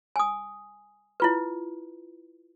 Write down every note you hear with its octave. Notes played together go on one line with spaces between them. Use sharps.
G#5 D#6
E4 F4 B4